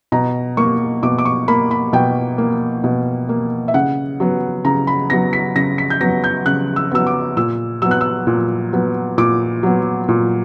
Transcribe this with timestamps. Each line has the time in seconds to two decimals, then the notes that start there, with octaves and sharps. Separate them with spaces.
0.12 B2 A#5
0.57 A#3 C#6
1.03 B2 D6
1.18 D6
1.25 C#6
1.48 A#3 B5
1.71 B5
1.93 B2 G5
2.38 A#3
2.84 B2
3.29 A#3
3.68 E5
3.74 C#3 F#5
4.20 F#3 B3
4.65 C#3 A#5
4.87 B5
5.10 F#3 B3 A#6
5.33 B6
5.56 C#3 A#6
5.78 B6
5.90 G6
6.01 F#3 B3 A#6
6.24 G6
6.46 C#3 F#6
6.76 E6
6.91 F#3 B3 E6
7.07 D6
7.37 A#2 E6
7.82 F#3 B3 E6
7.91 F#6
8.01 E6
8.27 A#2
8.73 F#3 B3
9.18 A#2 D6
9.63 F#3 B3
10.08 A#2